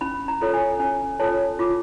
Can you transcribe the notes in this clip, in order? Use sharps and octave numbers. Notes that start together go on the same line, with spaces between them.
C#4 B5
A#5
F4 A4 C#5
G#5
C#4 G#5
F4 A4 C#5 A5
F4 D6